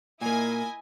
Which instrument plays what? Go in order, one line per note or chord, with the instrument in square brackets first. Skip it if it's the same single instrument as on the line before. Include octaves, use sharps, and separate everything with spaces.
[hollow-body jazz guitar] A#2 A#3 [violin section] E4 D#5 G#5